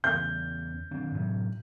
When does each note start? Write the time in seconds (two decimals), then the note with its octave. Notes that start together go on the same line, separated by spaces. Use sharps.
0.04 E2 C#3 G6
0.91 D#3 C4 D4
1.12 A2 C3 F#3